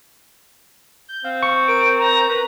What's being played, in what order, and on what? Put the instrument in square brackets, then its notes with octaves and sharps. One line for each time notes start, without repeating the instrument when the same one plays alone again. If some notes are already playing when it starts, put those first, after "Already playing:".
[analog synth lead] G6
[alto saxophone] C4 [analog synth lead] F5
[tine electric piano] C#6
[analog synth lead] A#4 [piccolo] D7
[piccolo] A#5
[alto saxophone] B4